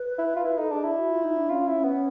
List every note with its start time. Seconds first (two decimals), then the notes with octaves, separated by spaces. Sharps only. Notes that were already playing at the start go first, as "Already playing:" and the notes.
Already playing: B4
0.19 E4
0.37 F4
0.45 E4 B4
0.58 D#4 A4
0.71 D4 G#4
0.84 E4
0.97 F#4
1.10 F4
1.24 D#4
1.36 D4
1.50 C#4 F4
1.67 E4
1.76 C#4
1.84 B3